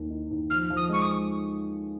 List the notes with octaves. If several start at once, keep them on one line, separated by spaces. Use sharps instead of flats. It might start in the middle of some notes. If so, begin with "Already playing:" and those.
Already playing: D#2 A#3
D#4
D#2
F3 F6
F3
D#6
G#3 C#6
D#6